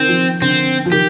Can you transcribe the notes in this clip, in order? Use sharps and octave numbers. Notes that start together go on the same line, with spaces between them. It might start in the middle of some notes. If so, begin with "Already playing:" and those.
Already playing: D#3 C4
F3
D3 C4
F3
D#3 G4